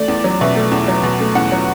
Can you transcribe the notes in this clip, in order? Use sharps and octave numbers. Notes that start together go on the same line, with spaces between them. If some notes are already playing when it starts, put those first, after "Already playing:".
Already playing: A3 D5
E2
F#3
B2 E5
A3
E2
F#3
B2
A3
E2 F#5
F#3